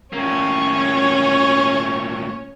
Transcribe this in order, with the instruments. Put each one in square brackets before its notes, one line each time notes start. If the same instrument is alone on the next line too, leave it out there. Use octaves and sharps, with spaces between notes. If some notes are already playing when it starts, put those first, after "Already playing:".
[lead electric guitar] A2 A#3 [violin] C#4 C#5